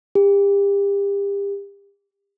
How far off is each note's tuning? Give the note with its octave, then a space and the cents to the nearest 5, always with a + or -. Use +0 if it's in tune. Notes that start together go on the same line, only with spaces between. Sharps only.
G4 +35